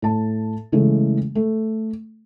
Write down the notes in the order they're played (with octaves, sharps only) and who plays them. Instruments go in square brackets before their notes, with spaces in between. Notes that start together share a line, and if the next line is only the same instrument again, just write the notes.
[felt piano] A2 A5
C#3 E3 G#3 A3
A3